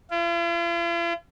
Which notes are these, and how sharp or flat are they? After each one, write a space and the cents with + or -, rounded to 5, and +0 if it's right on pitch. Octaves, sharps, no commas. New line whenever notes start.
F4 -45